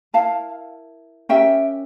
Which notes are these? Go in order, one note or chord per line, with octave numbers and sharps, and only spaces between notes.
E4 A#4 F5 A5
C#4 G4 A#4 E5 G5